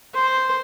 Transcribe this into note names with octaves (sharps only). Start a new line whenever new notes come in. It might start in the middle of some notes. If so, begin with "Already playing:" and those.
C5